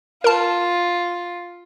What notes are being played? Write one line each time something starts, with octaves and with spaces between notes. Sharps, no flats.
F4 A#4 A5